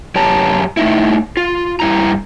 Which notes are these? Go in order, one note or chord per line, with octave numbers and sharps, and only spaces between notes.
F#2 G4 C#5 A5 A#5
A3 D#4 E4
F4
G2 E4 A#5